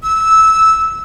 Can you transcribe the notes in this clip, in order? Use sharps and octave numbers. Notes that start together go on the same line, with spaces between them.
E6